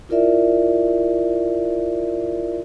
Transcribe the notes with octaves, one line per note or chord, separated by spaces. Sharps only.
E4 F4 A#4 D5 E5